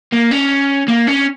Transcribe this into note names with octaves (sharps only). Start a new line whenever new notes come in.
A#3
C#4
A#3
C#4